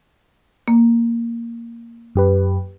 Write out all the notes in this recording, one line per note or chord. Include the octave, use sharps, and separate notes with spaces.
A#3
F#2 G4 B4